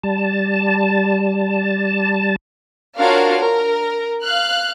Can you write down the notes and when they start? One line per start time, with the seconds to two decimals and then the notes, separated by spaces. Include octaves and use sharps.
0.03 G3 A5
2.98 D4 F4 F#4 A#4 C#5 F5
3.38 A#4
4.22 F5 F6 F#6